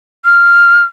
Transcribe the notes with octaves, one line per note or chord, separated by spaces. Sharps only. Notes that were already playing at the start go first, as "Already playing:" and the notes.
F6